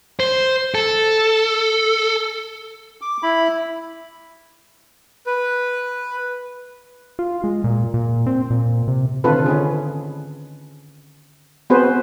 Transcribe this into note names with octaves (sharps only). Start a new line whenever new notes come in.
C5
A4
D6
E4 B5
B4
F4
G#3
A#2
A#2
C4
A#2
C3
D3 D#3 C4 F4 A4 B4
D#3 C#4 G#4
B3 C4 F#4 G#4 B4 C5